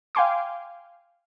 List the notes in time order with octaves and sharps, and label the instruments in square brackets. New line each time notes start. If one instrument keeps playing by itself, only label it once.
[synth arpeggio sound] F5 G5 G#5 C6 D6